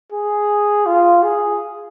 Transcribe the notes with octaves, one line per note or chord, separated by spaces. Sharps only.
G#4
F4
G#4